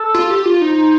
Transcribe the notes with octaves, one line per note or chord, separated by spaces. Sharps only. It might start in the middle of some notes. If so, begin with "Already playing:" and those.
Already playing: A4
F4
G4
F4
D#4 C5